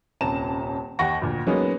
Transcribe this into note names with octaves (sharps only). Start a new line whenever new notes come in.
D#1 C2 C#4 A5 A#5 E7
D#2 F#5 G5 C#6 A#6
D2 A#2
F#3 G#3 A#3 B3 C#4 D#4